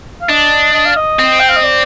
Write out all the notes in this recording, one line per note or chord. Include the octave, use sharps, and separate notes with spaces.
F5
D4 D#5
D#5
F5
D#5
C4
G5
F5
D#5
D5